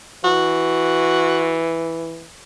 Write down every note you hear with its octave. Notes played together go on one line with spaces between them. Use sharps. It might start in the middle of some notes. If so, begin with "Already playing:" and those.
E3 F#4